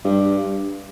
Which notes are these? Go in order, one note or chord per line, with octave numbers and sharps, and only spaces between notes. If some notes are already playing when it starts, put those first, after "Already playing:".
G2